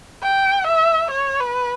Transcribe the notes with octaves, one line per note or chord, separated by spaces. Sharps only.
G5
E5
C#5
B4